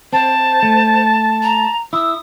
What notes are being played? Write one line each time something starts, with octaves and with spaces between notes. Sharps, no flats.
C4 C5 A5
A3
A#5
E4 D#6 E6